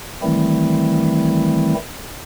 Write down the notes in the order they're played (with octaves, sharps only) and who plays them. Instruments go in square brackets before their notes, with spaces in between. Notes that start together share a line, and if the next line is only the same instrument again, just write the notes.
[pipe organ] D#3 E3 G3 A3 C4 E4